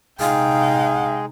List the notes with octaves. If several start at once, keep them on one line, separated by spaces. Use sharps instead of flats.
C3 G#3 D#4 G#4 F5 G5